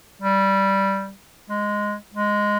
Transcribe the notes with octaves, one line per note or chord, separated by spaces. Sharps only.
G3
G#3
G#3